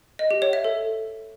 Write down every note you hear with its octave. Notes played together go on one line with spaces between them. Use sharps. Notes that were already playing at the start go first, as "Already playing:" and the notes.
D#5
G4
C#5
E5
A4